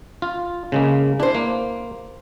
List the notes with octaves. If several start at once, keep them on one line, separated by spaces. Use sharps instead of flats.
F4
C#3 G#3 A#3
D4 E4 C5
A#3